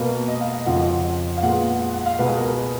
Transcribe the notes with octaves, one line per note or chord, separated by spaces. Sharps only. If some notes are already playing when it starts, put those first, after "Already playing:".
Already playing: B2 A#3 B4
D#5
F5
D#5
F2 C#3 F3 F#5
F5
A#2 G#3 B3 F#5
F#5
F#5
F5
C#2 B2 G#3 B3 B4
G#4
A#4